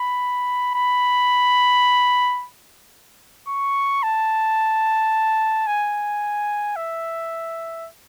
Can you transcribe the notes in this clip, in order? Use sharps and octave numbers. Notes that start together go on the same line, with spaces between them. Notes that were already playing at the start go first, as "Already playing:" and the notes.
Already playing: B5
B5
C#6
A5
G#5
E5